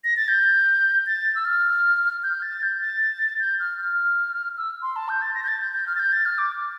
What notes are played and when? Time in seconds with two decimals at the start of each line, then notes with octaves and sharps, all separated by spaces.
0.04 A#6
0.17 A6
0.28 G6
1.06 A6
1.35 E6
1.45 F6
2.23 G6
2.42 A6
2.63 G6
2.81 A6
3.40 G6
3.59 F6
3.79 F6
4.58 E6
4.82 C6
4.96 A5
5.09 G6
5.22 A6
5.35 A#6
5.43 G6
5.48 A6
5.61 G6
5.73 G6
5.87 F6
5.95 A6
5.99 G6
6.13 A6
6.25 F6
6.38 D6